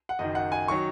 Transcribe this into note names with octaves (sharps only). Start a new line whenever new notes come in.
F#5
F#1 F#2 D#3 D#5
F#5
G#5
D#3 F#3 C#6